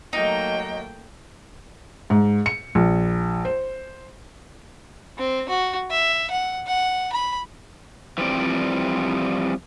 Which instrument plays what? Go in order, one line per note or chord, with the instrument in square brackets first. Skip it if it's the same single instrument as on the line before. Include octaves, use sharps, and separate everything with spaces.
[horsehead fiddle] F#3 A#3 [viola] A3 G5 [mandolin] D#4 [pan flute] D#5
[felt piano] G#2
C#7
A#1
C5
[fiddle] C4
F#4
E5
F#5
F#5
B5
[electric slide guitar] E3 F3 G3 C4 D5